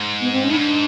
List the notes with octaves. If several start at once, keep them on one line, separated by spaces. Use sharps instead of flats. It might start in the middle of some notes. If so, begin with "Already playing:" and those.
Already playing: G#2
B3
C4
C#4
A2 D#4
G#2 D4